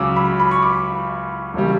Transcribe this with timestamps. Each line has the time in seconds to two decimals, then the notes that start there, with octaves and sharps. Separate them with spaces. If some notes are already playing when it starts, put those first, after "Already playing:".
Already playing: C#2 C#3 F#3 D6 E6
0.16 B5
0.40 B5
0.51 C#6
0.63 D6
1.54 E1 C#3 G3